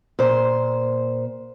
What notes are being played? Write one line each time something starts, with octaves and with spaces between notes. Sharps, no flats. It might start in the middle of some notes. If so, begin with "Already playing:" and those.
A#2 C5